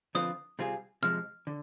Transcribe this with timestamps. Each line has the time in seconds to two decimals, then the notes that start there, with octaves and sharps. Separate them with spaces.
0.15 D3 F3 C4 F4 B4 D#6
0.59 C3 G3 C4 F4 G#4
1.02 C3 F3 G#3 F6
1.47 D3